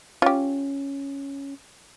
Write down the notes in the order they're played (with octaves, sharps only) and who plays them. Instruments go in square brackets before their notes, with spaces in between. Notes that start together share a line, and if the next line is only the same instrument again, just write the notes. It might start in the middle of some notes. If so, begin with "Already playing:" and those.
[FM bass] C#4 [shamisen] F4 G4